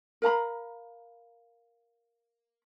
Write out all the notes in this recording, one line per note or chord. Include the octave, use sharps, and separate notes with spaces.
A#4 F5 A#5 B5